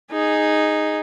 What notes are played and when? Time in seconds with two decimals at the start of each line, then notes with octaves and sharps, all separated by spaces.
0.12 D#4 G#4